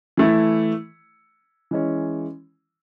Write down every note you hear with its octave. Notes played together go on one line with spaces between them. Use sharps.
E3 A3 E4
E3 G#3 C#4